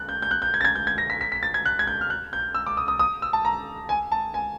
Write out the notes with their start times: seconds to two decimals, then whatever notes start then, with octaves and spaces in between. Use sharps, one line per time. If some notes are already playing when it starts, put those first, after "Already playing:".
Already playing: F#6
0.09 G6
0.22 G6
0.31 F#6
0.42 G6
0.54 G#6
0.61 A6
0.65 G#6
0.75 G6
0.87 G#6
0.98 A#6
1.10 B6
1.21 B6
1.32 B6
1.43 A6
1.54 G#6
1.65 F#6
1.79 G#6
1.87 G6
2.01 F6
2.10 F#6
2.33 G6
2.55 E6
2.67 D6
2.77 D#6
2.88 D#6
2.99 D#6
3.22 E6
3.33 A5
3.45 A#5
3.89 G#5
4.12 A5
4.34 G#5